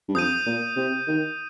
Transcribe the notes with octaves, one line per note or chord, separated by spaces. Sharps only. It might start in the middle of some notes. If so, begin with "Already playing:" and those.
G2
F2 D#6 G6 D#7
A#2
C3
D#3